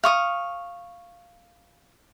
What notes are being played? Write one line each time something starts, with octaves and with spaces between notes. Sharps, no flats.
F5 C#6 D#6